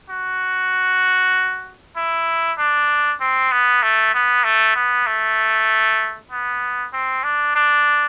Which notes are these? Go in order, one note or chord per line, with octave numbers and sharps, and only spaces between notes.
F#4
E4
D4
C4
B3
A3
B3
A3
B3
A3
B3
C4
D4
D4